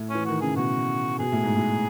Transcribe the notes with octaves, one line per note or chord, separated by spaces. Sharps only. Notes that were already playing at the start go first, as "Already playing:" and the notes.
Already playing: A2
E3 C#4
D#3 F#4
C#3 G#4
B2 F#4
B2 G#4
A2
G#2
A2